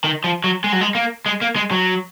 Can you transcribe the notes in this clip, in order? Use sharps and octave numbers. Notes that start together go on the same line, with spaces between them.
D#3
F3
F#3
G#3
F#3
G#3
A#3
G#3
A#3
G#3
F#3